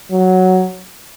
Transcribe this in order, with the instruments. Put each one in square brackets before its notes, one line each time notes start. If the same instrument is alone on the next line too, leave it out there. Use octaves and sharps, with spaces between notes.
[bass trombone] F#3